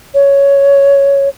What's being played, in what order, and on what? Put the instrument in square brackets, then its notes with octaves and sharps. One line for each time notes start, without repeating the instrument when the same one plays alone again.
[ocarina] C#5